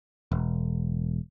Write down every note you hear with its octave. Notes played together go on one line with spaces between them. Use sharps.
E1